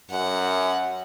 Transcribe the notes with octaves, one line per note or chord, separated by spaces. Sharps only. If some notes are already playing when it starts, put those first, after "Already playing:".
F#2 F#5